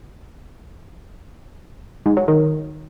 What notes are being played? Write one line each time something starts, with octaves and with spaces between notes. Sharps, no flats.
G#2
F#3
D#3